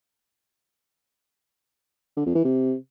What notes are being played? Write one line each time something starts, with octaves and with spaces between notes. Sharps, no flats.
D3
F2
E3
C3